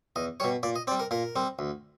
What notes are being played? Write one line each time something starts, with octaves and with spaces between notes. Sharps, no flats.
E2 D#5
B2 G3 C#5
A#2 D5
D#5
G3 C4 D5
A#4
A#2 A#4
G3 C4
D2